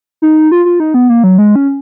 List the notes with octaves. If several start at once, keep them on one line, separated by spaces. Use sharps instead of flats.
D#4
F4
F4
D#4
B3
A#3
F#3
G#3
C#4